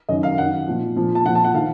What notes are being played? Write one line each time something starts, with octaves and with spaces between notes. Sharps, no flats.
F#2 D#3 D#5
F5
F#2 D#3 F#5
A#2 F3
A#2 F3
A5
A#2 F3 F#5
A5
F#5
D#3 F5